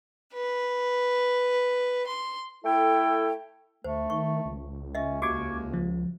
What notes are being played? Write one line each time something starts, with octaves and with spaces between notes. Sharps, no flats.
B4
C6
A3 E4 A4 G5
D2 A3 C5
D#3 C#6
C#2
C#4 D#5 E5
D#2 F#4 C#6 D6 G#6
F3